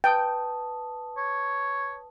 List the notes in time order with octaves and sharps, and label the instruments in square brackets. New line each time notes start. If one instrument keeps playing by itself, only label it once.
[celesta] B4 A5 D#6 [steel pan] G5
[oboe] C#5